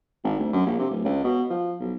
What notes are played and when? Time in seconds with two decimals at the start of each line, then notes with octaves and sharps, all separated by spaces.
0.24 G#1
0.39 D2
0.53 F#2
0.66 A#1
0.79 C3
0.91 D1
1.05 C#2
1.24 B2
1.50 F3
1.80 B1